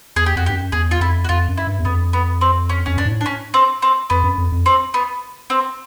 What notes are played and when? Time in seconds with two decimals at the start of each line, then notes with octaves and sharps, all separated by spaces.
0.16 E2 G#4
0.26 G4
0.36 F2 F#4
0.46 G4
0.50 G2
0.54 F#2
0.72 E2 G#4
0.91 F4
1.00 F2 E4
1.24 F#4
1.29 F2 F4
1.48 F#2
1.57 E4
1.67 G2
1.79 E2
1.85 F2 B3
2.13 B3
2.41 C4
2.69 C#4
2.86 F2 C#4
2.97 F#2 D4
3.06 G#2
3.11 A2
3.21 D4
3.26 C#4
3.54 C4
3.82 C4
4.10 F2 B3
4.24 F#2
4.38 F2
4.52 F2
4.66 C4
4.94 B3
5.50 C4